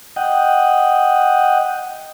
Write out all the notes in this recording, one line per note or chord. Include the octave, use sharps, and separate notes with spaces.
D#5 F#5 G5